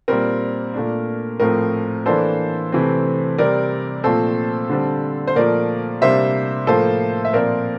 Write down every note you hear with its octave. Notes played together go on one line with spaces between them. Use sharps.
A#2 G3 C4 A#4
A#2 A3 D4
A2 F3 A3 C4 A#4
E3 A#3 D4 A4 C5
C3 E3 A3 C4
C3 G3 C4 A#4 D5
A#2 F3 A3 C4 A4 C5
D3 G3 C4
C5
A#2 F3 A3 A#4 D5
C3 G3 A#3 D4 C5 E5
A2 F3 A#3 A4 C5
E5
A#2 F3 C4 A#4 D5